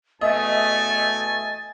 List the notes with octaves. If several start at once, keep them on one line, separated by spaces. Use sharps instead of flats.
E2 B2 A3 D#5 E5 G#5 A6